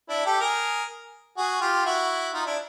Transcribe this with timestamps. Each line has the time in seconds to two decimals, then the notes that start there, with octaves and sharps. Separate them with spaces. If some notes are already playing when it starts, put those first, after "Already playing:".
0.09 D4 E4
0.26 G4 A4
0.40 G#4 A#4
1.37 F#4 G#4
1.61 F4 G4
1.85 E4 F#4
2.33 D#4 F4
2.45 D4 E4